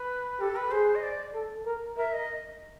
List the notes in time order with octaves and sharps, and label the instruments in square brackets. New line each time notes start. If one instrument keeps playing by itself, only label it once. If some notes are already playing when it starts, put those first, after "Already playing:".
Already playing: [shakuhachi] B4
[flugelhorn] G4 [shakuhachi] A4
[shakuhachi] B4
[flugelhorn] G#4 [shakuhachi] C5
[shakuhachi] D#5
D5
[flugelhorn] A4
A#4
[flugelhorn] A#4 [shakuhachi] E5
[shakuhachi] D#5